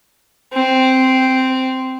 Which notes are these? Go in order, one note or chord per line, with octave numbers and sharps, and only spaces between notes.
C4